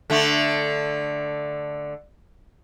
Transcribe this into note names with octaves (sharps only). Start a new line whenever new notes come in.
D3 A3